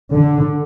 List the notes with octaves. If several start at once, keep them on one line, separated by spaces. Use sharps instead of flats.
D3